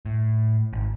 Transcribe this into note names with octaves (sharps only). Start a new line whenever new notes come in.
A2
G#1